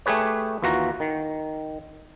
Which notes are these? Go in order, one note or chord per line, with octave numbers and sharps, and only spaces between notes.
A3 G4 G#4 B4 C#5
D#2 E3 F4 F#4 A#5
D#3